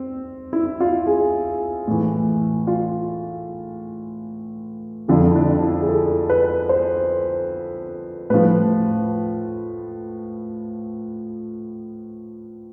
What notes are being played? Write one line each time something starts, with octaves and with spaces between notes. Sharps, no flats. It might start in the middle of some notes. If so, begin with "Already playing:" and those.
Already playing: C4
E4
F4
G#4
A2 E3
F4
F2 D3 F3 E4
E4
D4
E4
G#4
A4
B4
C5
A2 F3 B4